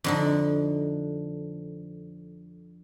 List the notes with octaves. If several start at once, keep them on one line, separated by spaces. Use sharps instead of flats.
F2 D3 D#4